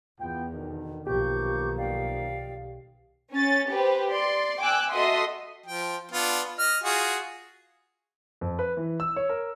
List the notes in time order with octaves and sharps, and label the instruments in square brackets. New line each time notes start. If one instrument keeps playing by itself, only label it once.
[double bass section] E2 [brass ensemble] B3 F4 G5
[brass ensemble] B2 D3 D#3
[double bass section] B1 D#3 [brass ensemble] F3 A#3 [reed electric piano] G4 [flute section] C#6 D6 G6
[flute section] D5 F5 G5
[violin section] C#4 A6
G4 B4 C5
D5 C6
G5 G#5 D6 E6 F#6
F#4 A4 D#5 E5 C6 D#6
[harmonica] F3 G5
B3 D4 F4
D#5 F6
F4 F#4 G#4
[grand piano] F2
B4
E3
E6
C#5
A#4